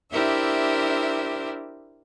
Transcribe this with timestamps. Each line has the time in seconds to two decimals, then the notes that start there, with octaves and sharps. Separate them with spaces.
0.12 D4 E4 G4 A#4 C5 E5